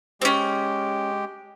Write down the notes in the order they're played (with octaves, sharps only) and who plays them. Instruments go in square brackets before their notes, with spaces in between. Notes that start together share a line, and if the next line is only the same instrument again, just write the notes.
[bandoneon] G#3 G4 [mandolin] C4 C#4